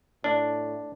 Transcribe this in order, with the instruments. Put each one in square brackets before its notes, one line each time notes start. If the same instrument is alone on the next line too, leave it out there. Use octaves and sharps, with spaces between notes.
[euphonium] A2 [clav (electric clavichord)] D4